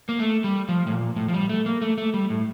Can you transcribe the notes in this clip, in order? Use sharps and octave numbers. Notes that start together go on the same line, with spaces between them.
A#3
A3
G3
F3
A2
A#2
A2
F3
G3
A3
A#3
A3
A3
G3
A2